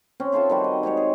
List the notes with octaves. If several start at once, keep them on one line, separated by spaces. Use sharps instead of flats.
C4 C#4
F4 A4 C5 E5
D#3 G3 F#4
D#5
G#3 C4 G4 C#5
G#4